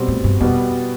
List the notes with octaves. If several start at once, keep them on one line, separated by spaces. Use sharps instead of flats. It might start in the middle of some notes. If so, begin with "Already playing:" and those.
Already playing: B2 G3 C4
A2
G2
F2 B2 G3 B3